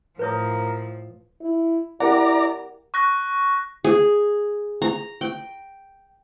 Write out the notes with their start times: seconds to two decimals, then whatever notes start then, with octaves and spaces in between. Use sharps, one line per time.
0.19 A2 F3 A#4 B4 C#5 D#6
1.41 E4
2.00 E4 G4 A#4 D5 F#5 A#5
2.94 C#6 F#6 A#6
3.85 G#4
4.82 A#5
5.21 G5